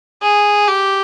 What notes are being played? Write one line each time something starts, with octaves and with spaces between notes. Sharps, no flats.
G#4
G4